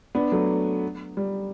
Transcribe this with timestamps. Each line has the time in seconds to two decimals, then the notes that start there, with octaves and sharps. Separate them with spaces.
0.15 B3 D4
0.32 F#3 A3
1.17 G3